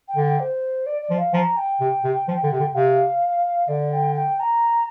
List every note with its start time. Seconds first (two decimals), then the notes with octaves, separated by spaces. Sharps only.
0.08 G5
0.16 D3
0.24 G5
0.40 C5
0.86 D5
1.02 D5
1.10 F3
1.18 F5
1.33 F3 A#5
1.57 G5
1.80 C3
2.04 C3
2.28 F3
2.43 D3
2.52 C3
2.60 D3
2.75 C3 F5
3.68 D3 D5
3.92 G5
4.15 G5
4.40 A#5